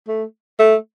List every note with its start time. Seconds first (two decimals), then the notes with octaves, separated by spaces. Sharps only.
0.08 A3
0.59 A3